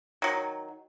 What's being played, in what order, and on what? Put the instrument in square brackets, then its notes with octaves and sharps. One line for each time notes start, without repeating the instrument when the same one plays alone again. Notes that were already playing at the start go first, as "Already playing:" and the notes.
[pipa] D#3 F#3